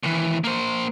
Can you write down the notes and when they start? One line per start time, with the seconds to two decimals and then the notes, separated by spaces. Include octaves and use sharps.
0.03 D#2 E3
0.44 A#3 C5